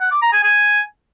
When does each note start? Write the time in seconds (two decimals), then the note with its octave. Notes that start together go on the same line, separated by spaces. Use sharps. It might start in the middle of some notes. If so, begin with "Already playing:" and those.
0.01 F#5
0.11 D6
0.22 A#5
0.33 G#5
0.43 G#5